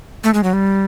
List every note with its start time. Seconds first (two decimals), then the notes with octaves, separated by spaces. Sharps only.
0.24 A3
0.34 G#3
0.44 F#3
0.53 G3